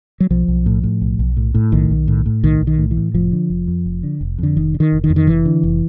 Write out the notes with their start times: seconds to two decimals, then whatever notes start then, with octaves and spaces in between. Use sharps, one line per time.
0.20 F#3
0.30 B1 F3
0.48 B1
0.66 A2
0.84 A2
1.02 B1
1.19 B1
1.37 A2
1.54 A2
1.72 B1 D#3
1.90 B1
2.08 A2
2.26 A2
2.43 B1 D#3
2.61 B1
2.67 D#3
2.79 A2
2.91 E3
2.97 A2
3.14 F1 F3
3.32 D3
3.50 F1
3.67 F2
3.85 F1
4.03 D3
4.21 F1
4.38 F2 D3
4.57 F1 D#3
4.74 D3
4.80 D#3
4.92 F1
5.04 D#3
5.10 F2
5.16 D#3
5.27 F1 E3
5.46 D3
5.63 F1